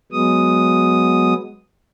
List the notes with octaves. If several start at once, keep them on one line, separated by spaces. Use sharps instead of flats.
F#3 G#3 B3 D#6